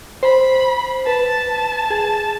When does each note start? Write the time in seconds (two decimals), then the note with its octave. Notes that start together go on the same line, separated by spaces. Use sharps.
0.23 C5 B5
1.06 B4 A5
1.90 G#4